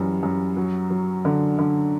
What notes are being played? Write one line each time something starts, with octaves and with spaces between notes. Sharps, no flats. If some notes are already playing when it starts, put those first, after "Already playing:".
Already playing: F#2 E3 G3
F#2
F#3
F#3
D3
D3